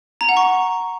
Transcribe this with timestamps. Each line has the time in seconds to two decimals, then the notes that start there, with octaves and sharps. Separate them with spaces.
0.21 A#5
0.29 F#5
0.37 C#6